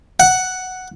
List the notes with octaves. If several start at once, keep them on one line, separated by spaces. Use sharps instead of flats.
F#5